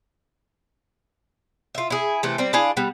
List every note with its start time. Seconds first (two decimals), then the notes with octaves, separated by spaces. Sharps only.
1.75 F4 E5
1.90 E4 G#4
2.23 C3 E3 A3
2.38 G3 C4
2.53 D4 E4 G#4 F5
2.77 G3 B3